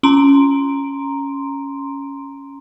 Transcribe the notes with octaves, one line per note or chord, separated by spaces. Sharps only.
C#4 A#5 C6 D7